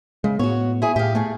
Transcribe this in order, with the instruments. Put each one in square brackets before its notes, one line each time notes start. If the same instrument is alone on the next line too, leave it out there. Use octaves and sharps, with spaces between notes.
[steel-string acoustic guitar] C#3 [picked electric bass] G#3
[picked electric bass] A2 B3 [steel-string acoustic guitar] F#4 C#5
[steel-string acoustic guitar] E4 G#4 C#5
[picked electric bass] A2 [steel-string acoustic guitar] G4 F5
[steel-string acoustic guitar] A3 G#4